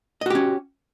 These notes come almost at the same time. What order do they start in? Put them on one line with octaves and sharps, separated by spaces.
D#5 F#4 G4 C#4